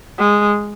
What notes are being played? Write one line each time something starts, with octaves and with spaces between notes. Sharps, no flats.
G#3